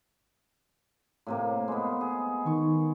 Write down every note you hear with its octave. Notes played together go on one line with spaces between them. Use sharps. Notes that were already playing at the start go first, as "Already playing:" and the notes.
A2 C3 A#3
G#3 B3
G#4
D#3 C#6